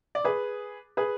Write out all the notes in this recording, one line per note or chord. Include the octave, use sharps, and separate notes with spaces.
D5
G#4 B4
G#4 B4